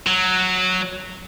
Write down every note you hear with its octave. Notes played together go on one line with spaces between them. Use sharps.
F#3